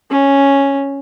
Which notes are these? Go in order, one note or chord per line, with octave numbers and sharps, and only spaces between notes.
C#4